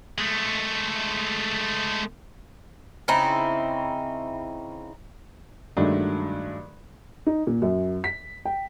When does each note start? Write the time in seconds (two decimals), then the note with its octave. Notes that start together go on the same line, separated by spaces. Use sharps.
0.18 G#3 A3
3.08 C#3 C4 D#4 E4
5.77 G2 D#3 F#3 G#3 A3 D4
7.26 D#4
7.47 A#2
7.62 F#2
8.04 B6
8.45 G5